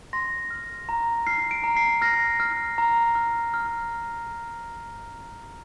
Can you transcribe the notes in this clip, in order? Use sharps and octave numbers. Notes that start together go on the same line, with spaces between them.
C6 A#6
F6
A#5
F6 C7
D7
A#5
C7
F6 A#6
F6
A#5
F6
F6